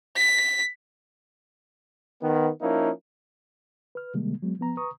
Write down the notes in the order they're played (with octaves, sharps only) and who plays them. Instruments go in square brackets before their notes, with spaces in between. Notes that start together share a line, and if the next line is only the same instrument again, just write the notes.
[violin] B6
[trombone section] D#3 B3
F3 A#3 C#4 D#4 E4 A#4
[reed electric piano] B4 F6
C3 D#3 G3 G#3 A#3
F#3 G#3 B3
F3 B3 A#5
B4 A#5 C#6 D#6